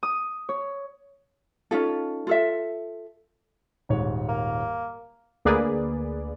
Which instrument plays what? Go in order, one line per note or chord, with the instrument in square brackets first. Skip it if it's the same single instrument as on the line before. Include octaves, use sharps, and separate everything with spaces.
[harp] D#6
C#5
[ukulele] C#4 D#4 F4 A4
F4 A4 E5
[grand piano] D#1 G#2 C#5
[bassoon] A#3
[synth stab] D2 A#3 G#4 B4 D5